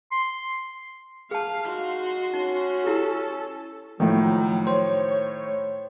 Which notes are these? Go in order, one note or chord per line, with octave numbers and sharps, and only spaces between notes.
C6
G#4 F5 A5
D#4 F#4 C6
C#4 D#4
E4 G4 A4
A2 D#3 F3 F#3 A3
C5 C#5